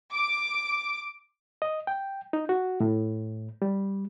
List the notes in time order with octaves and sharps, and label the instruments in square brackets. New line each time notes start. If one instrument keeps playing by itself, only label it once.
[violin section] D6
[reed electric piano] D#5
G5
D#4
F#4
A2
G3